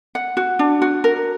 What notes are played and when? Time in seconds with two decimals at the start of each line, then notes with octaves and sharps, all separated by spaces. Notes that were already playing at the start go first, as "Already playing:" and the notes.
0.15 F#5
0.37 F#4
0.59 D4
0.82 F#4
1.04 A#4